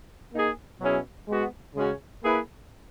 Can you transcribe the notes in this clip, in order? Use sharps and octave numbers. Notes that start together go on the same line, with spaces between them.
A#3 D#4 G#4
B2 F#3 C#4 E4 G#4
G#3 B3 F#4
C#3 G#3 C#4 F#4
A#3 E4 G#4 B4